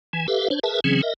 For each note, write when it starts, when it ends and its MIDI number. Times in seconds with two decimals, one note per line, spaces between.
0.13 0.27 52
0.13 0.27 80
0.28 0.48 67
0.28 0.48 69
0.28 0.48 71
0.28 0.48 76
0.28 0.48 77
0.50 0.59 62
0.50 0.59 72
0.50 0.59 73
0.63 0.80 68
0.63 0.80 70
0.63 0.80 71
0.63 0.80 76
0.63 0.80 81
0.84 1.01 49
0.84 1.01 52
0.84 1.01 54
0.84 1.01 60
0.84 1.01 61
0.84 1.01 68
1.02 1.14 70
1.02 1.14 75
1.02 1.14 76